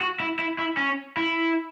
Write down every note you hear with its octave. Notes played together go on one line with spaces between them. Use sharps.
F#4
E4
E4
E4
C#4
E4